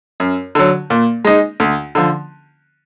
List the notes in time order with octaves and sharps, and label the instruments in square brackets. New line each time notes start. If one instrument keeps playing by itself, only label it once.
[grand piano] F#2
D3 F#3
A#2
G#3 D#4
D2
D3 F3